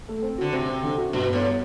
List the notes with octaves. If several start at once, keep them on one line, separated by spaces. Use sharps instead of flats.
A3
C4
D3 F#4
C3 C4
C4
D3
F#4
G2 B2
A2 B3